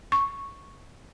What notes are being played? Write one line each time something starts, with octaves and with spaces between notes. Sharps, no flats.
C#6